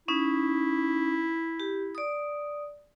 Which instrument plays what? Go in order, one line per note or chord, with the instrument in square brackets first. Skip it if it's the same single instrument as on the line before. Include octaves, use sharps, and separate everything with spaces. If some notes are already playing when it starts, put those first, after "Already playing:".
[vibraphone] C#4 D#4 [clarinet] E4
[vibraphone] G4
D5 D#6